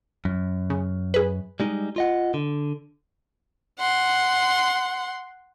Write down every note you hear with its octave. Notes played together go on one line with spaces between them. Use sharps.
F#2
C#3
G#4 B4
G3 G#3 D#4
F4 D#5 F#5
D3
F#5 C6